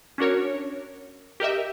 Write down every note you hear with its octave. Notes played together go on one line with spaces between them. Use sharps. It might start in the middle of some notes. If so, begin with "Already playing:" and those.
C#4 D4 F#4 A#4 C#5
G4 A#4 D#5 E5